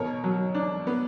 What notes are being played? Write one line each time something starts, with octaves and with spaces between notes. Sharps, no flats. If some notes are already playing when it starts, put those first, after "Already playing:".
Already playing: B2 A#4 C#5
F#3
D4
B3